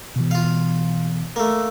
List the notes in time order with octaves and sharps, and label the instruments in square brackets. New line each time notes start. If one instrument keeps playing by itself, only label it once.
[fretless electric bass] B2 E3
[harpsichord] F4 F5
A3 A#3